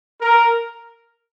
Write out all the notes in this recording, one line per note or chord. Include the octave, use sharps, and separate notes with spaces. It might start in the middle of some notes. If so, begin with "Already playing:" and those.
A#4